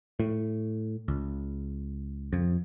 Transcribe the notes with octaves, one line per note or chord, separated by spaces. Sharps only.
A2
C#2
F2